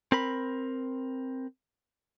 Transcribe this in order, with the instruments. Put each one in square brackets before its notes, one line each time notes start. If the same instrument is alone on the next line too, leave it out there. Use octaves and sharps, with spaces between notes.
[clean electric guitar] C4 A#4 B5